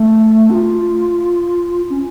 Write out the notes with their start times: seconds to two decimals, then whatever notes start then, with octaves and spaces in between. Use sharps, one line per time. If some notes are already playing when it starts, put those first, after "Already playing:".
Already playing: A3
0.50 F#4
0.54 F4
1.90 C#4